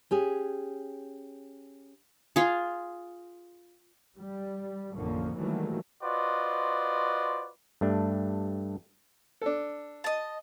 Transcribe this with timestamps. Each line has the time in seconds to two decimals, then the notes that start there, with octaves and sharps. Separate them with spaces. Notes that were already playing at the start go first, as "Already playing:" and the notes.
0.11 C#4 G4 G#4
2.36 F4 G#4
4.17 G3
4.95 A1 F2 D3 F3 A#3 C#4
5.36 D#3 E3 F#3 G3 A3 A#3
6.03 F4 F#4 B4 C5 D5 D#5
7.81 G2 A3 D4
9.42 D4 A4
10.04 D#5 A5